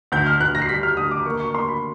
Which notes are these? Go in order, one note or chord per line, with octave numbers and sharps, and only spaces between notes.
D2 G6
F6
D2 F#6
A#6
C7
G3 B6
F6
D2 D#6
D6
A#3 C#6
C#6
A#3 C6
B5